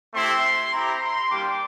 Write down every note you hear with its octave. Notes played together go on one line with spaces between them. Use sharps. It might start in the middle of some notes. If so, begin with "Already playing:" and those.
A3 C4 E4 G4 C6
C4 E4 G4 A#5
C6
G3 A#3 D4 G4 D6